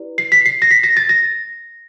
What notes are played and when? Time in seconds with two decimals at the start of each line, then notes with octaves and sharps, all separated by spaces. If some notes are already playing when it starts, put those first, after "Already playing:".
Already playing: E4 G4 B4 D5
0.18 C7
0.32 B6
0.46 C7
0.62 A#6
0.71 B6
0.83 A#6
0.97 A6
1.09 A#6